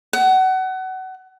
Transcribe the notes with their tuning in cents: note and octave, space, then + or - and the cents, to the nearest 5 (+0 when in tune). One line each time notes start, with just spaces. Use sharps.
F#5 +25